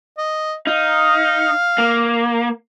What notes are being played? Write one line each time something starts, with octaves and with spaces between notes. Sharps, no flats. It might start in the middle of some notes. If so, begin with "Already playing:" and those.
D#5
D#4 F5
A#3